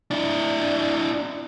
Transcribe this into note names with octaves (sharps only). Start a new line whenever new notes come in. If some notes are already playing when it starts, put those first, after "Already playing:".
D4 E4